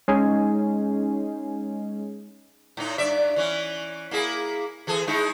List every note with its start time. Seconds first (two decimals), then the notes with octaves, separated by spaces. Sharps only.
0.08 G#3 C#4 D#4 G#4
2.77 A2 D#4
2.98 G2 D5 E5
3.36 E3 C#4
4.11 A#3 E4 G#4
4.87 E3 G#4 A4
5.07 G#3 D#4 E4